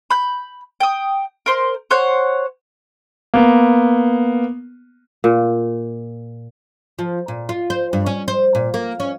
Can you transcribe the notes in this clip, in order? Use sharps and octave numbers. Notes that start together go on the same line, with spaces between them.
B5 G6
G5 D#6
A#4 C5 C6
C5 C#5 F#5 G6
A#3 B3
A#2
F3
A#2
F4
C5
G2
C#4
C5
A#2
A#3
C#4